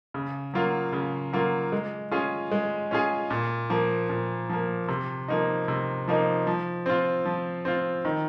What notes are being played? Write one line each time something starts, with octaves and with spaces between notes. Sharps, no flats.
C#3
F#3 A#3 F4
C#3
F#3 A#3 F4
G#3
C#4 F4 G#4
G#3
C#4 F4 G#4
A#2
F3 A#3
A#2
F3 A#3
C3
F3 A#3 D#4
C3
F3 A#3 D#4
F3
C4 F4
F3
C4 F4
D#3